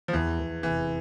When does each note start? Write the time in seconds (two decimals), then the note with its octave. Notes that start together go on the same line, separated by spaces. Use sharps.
0.08 F3
0.13 E2 E3
0.39 E2
0.63 F1 E3